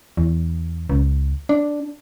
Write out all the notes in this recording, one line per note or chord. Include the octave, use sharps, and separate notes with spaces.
E2
C#2
D4